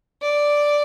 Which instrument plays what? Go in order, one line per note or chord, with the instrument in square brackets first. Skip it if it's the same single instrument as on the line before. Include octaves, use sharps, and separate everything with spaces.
[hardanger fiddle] D5